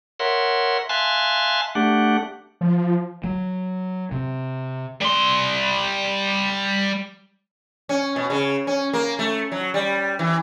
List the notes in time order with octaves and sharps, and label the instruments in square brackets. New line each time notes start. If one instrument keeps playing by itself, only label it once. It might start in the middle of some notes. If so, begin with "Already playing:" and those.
[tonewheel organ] A#4 C#5 E5 F#5 C6
E5 F5 G#5 A5 C6 F#6
A3 D4 G4 F#5
[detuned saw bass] F3
[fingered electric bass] F#3
C3
[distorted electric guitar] G3 C6
[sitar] C#4
B2
C#3
C#4
A#3
A3
F#3
G3
E3